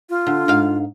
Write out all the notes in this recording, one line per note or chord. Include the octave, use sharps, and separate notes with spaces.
F4
D3
G#2 F5